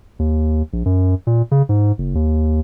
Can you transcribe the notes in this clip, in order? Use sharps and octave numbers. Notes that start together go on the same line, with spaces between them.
D#2
A#1
F#2
A#2
C#3
G#2
F#1
D#2